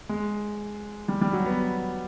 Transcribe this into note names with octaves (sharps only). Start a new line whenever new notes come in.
G#3
G3
G3
F#3
B3